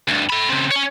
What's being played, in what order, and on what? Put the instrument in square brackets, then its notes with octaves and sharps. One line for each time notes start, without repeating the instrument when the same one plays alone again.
[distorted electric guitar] D2 G2
A4 B5
C#3 C4
C#4 C#5